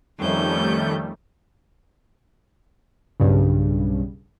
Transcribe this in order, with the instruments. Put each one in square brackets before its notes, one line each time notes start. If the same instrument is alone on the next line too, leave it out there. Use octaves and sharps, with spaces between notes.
[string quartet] F2 C#4 G6 [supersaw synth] D#3 G3 A3
[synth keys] B1 G2 C#3